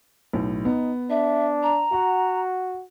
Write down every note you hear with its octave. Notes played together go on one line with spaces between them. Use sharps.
B1 A2
B3 D#4
D4 E5
A#5
F#4 F#5